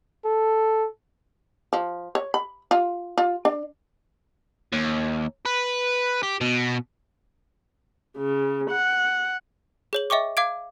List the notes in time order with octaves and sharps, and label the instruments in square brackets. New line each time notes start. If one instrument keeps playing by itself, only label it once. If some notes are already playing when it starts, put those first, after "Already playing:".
[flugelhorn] A4
[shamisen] F3
C#5
B5
F4
F4
D4
[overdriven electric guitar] D#2
B4
G4
B2
[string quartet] C#3
F#5
[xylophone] G#4 C#5 F#7
D#5 E5 G5 C#6 D6
F5 D6 G#6 D7